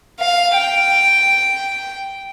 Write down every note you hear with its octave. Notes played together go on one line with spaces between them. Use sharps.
F5
G5